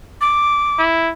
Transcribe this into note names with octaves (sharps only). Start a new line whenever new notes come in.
D6
E4